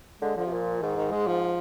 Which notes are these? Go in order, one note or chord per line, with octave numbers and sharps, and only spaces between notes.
D3 G#3
D3 F3
C3
A#2
G#2 D#3
D#3
G#3
F3